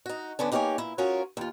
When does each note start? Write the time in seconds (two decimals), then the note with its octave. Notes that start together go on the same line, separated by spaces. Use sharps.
0.06 D#4 F#4
0.39 D3 B3 C#4 D4
0.52 A#3 D#4 G4 A#4 C#5 G#5
0.78 A#2 E4
0.98 C#4 F4 F#4 G#4 A#4 C#5
1.37 D#2 F4